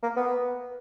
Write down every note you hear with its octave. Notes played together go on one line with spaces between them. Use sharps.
A#3
B3